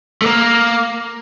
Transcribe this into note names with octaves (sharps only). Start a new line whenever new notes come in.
A3
A#3